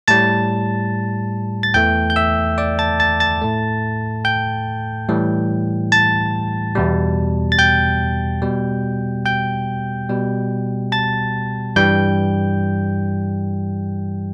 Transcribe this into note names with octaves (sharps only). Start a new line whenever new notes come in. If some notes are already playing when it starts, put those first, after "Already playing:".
A2 G3 A5 A6
A6
E2 E3 A3 G5 G6
G6
E5 E6
D5 D6
A5 A6
A5 A6
A5 A6
A2 A3
G5 G6
A2 E3 G3
A5 A6
E2 B2 G3
A6
G5 G6
B2 G3
G5 G6
B2 G3
A5 A6
G2 E3 G3 G5 G6